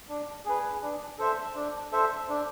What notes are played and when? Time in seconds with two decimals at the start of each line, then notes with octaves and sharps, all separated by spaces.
0.09 D4
0.45 G#4 B4
0.82 D4
1.19 A4 C5 E5
1.55 D4
1.92 A4 C5 E5
2.29 D4